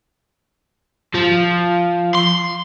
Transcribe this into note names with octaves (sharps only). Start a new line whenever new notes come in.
F3
C6